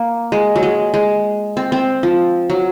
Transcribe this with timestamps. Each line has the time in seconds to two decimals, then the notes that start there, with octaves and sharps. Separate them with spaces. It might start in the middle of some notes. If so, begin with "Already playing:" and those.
Already playing: A#3
0.32 G#3
0.56 F#3
0.63 G#3
0.94 G#3
1.57 C4
1.72 C4
2.03 F3
2.50 F#3